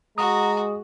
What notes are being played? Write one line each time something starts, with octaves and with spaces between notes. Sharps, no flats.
G#3 F#4 A#5 D#6